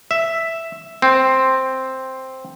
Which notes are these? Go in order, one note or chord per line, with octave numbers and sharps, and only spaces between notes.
E5
C4